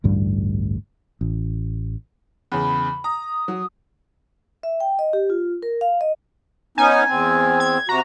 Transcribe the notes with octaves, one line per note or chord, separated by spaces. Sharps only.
A1 D2 G2 G3
A1
E2 C#3 B5
A#5 D#6
F#3
E5
G5
D#5
G4
F4
A#4
F5
D#5
B3 C#4 D#4 G#5
E2 C4
G#6
C3 F#4 A#5